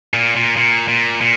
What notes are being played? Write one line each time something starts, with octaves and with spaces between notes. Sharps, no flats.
A#2
A#2
A#2
A#2
A#2